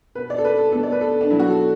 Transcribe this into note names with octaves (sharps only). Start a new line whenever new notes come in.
B2 B3 B4
D5
A4
B4
A4
B2 A3 A4
D5
B4
A4
D4
B2 F#3 B3 E4
F#4
A4